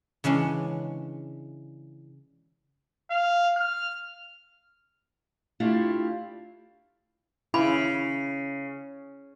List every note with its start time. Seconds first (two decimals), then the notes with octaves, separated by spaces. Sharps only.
0.24 C#3 E3 G#3 C#4 D4
3.11 F5
3.57 F6
5.60 A3 D4 E4 F4 G4
7.54 C#3 E4 G#5 B5